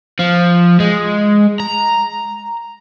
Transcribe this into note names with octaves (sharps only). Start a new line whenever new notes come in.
F3
G#3
A#5